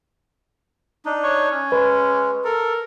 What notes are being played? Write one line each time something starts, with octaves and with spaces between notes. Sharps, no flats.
D4 D#4
C#5
C#4
G#3 B4
A4 A#4